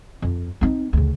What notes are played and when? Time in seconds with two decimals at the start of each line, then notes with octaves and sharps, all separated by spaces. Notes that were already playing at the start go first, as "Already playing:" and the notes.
0.22 F2
0.61 C4 D#4
0.93 D2 C#3